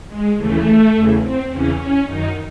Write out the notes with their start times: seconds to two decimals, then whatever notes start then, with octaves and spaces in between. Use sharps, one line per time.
0.08 G#3
0.36 D#2 C#3 E3 A3
0.93 E2 C#3 E3
1.22 C4
1.49 E2 C#3 E3 C#4
1.78 C#4
2.06 F#2 D#3 D#4